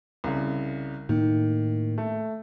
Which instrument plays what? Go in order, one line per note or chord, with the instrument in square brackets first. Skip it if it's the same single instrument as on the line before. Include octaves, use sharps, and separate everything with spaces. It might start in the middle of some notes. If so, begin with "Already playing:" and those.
[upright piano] C2 C#3
[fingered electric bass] A2 A#3 [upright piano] D#3
[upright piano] A3